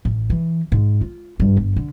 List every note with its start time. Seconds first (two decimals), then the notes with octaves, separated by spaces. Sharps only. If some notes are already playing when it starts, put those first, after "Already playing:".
0.05 A1
0.30 E3
0.72 G#2
1.01 F4
1.40 G2
1.57 G1
1.76 D3